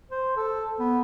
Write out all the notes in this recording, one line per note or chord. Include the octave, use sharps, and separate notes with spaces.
C5
A4
B3